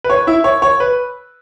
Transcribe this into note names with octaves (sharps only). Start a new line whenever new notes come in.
B4
C#5
E4 E5
C#5
C#5
B4